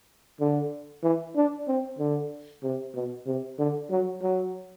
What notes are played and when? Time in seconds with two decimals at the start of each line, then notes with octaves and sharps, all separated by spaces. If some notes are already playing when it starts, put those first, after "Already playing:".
0.40 D3
1.03 E3
1.36 D4
1.67 C4
1.99 D3
2.63 C3
2.95 B2
3.27 C3
3.59 D3
3.90 F#3
4.22 F#3